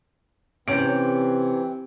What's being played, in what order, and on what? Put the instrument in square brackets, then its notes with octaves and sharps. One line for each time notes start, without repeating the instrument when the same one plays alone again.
[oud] C3 [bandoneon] E3 C4 [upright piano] C#4 D7